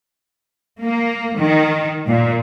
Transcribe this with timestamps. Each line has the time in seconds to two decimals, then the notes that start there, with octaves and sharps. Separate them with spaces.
0.81 A#3
1.39 D#3
2.06 A#2